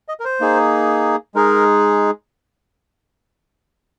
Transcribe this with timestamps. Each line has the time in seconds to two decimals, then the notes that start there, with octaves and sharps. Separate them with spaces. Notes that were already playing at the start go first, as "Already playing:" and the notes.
0.08 D#5
0.20 A#4
0.25 C5
0.40 A#3 D#4 G#4
1.34 G#3 D#4 G#4 A#4